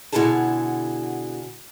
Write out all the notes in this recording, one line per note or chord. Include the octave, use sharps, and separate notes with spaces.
B2 D3 E4 F#4 G#4 A5